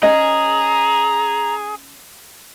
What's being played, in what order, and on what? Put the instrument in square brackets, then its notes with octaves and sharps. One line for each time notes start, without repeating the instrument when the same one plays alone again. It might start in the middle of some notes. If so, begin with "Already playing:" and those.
[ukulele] C#4 A#4 D#5 [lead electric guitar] G#4 [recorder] A#5